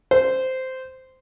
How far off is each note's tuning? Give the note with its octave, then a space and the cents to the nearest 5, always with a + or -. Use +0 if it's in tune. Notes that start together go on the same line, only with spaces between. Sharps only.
C5 -10